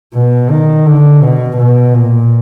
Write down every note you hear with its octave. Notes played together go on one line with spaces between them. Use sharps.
B2
D#3
D3
B2
B2
A#2